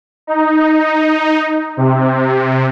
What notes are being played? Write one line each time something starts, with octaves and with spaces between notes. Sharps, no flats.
D#4
C3